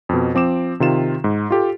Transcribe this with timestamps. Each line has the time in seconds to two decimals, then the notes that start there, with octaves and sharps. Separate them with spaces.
0.09 F2 B2
0.35 F3 C4 D6 E7
0.80 C3 D#3 F4 E7
1.24 G#2
1.51 F4 G4 A4